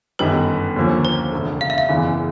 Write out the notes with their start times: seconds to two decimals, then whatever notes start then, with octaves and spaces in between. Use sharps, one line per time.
0.19 G1 F#2 D#3 G3 B3 B4
0.76 D#2 D3 F3 A#3 C#4
1.05 C5
1.32 E1 D2 C#3
1.61 F5
1.70 E5
1.78 F5
1.89 F#1 E2 C#3 E3